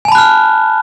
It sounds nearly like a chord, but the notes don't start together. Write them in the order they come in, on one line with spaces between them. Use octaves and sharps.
G#5 A5 B5 F#6 F6